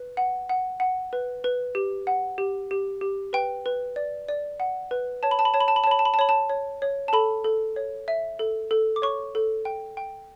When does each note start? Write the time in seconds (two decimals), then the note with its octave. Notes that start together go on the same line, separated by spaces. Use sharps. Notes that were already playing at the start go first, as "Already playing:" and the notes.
Already playing: B4
0.17 F#5
0.49 F#5
0.80 F#5
1.13 B4
1.44 B4
1.75 G4
2.07 F#5
2.38 G4
2.71 G4
3.01 G4
3.33 B4 G5
3.66 B4
3.96 D5
4.28 D5
4.60 F#5
4.91 B4
5.23 C#5 A5
5.31 B5
5.39 A5
5.45 B5
5.54 C#5 A5
5.60 B5
5.68 A5
5.76 B5
5.84 A5
5.87 C#5 B5
5.99 A5
6.05 B5
6.14 A5
6.19 C#5 B5
6.29 A5
6.49 C#5
6.82 C#5
7.08 A5
7.13 A4 B5
7.44 A4
7.76 C#5
8.08 E5
8.39 A4
8.71 A4
8.96 D6
9.02 C#5 C#6
9.35 A4
9.65 G5
9.97 G5